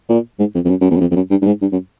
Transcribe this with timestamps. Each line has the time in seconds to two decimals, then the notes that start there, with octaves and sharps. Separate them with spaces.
0.09 A#2
0.39 G#2
0.54 F2
0.65 F2
0.70 F#2
0.81 F#2
0.91 E2
0.96 F#2
1.00 F2
1.11 F2
1.16 F#2
1.31 G2
1.42 G2
1.47 G#2
1.62 G2
1.72 F#2